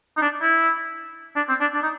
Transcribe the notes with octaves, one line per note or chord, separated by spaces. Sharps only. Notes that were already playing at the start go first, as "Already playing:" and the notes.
D#4
D4
E4
D4
C4
D4
D4
D#4